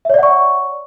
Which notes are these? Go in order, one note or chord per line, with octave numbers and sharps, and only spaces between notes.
C#5 D5 E5 F#5 C#6